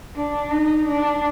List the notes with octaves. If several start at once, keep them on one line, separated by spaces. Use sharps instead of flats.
D4
D#4
D4